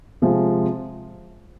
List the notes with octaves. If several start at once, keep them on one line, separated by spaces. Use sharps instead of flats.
C3 F3 G#3